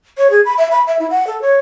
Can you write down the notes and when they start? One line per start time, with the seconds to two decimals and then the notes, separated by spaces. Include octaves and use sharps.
0.18 C#5
0.30 G#4
0.45 B5
0.58 E5
0.71 B5
0.87 E5
0.99 E4
1.11 F#5
1.27 A4
1.42 C#5